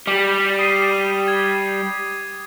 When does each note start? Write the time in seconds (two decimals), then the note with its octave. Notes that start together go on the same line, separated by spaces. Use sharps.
0.07 G3 D6
0.59 D#6 C7 D#7
1.28 G#6